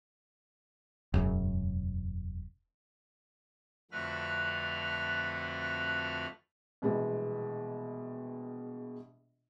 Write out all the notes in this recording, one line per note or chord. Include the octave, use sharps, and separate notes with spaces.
E1 F#2 C#3
F2 D3 A3 F#4 B4 F6
A#1 B2 E3 G3 G#3